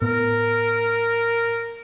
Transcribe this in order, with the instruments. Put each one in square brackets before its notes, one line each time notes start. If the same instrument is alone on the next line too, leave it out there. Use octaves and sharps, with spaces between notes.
[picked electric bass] A2 B3 [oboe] A#4